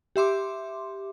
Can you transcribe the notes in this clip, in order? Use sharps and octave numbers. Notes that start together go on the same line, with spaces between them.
G4 E5 C6 D6